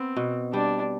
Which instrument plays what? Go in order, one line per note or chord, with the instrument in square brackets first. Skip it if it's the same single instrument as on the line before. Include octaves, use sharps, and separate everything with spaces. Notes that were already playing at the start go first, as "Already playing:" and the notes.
Already playing: [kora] B3 [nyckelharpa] C4
[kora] B2
[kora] G3 [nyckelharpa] D4